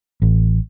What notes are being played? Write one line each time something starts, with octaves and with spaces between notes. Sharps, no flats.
A1